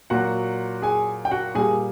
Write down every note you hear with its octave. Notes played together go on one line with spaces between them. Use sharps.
A#2 F#3 F#4 F#5
G#4 G#5
G5
F#4 F#5
A#2 G3 G#4 G#5